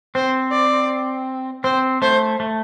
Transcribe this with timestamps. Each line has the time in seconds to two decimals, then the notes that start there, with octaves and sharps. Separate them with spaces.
0.15 C4 C5
0.51 D5
1.64 C4 C5
2.02 A3 C5
2.40 A3